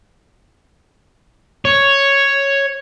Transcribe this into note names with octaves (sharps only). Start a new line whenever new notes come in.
C#5